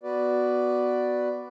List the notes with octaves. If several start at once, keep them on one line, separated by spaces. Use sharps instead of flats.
B3 F#4 B4 D5